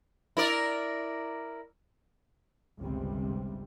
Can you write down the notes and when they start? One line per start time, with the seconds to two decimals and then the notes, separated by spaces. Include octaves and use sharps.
0.37 E4 A#4 D5
2.80 G1 C#2 G2 C3 G3 C4